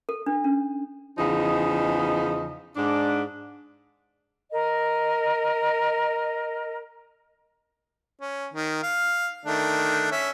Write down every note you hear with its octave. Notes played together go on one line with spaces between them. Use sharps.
A4
D4
C#4
E2 C#3 F3 D#4 D#5
G#2 D4
A#4 D#5
C#4
D#3
F5
D#3 A3 D4
C#4 E5